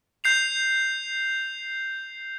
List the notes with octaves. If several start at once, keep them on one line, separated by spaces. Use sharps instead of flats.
G6 C7 F7